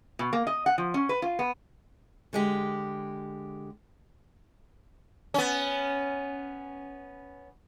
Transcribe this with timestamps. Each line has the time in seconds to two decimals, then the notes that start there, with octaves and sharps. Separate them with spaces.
0.19 B2
0.33 A#3
0.47 D#5
0.66 F#5
0.78 F3
0.94 C#4
1.09 B4
1.22 F4
1.39 B3
2.33 D3 G#3 G4
5.34 B3 C#4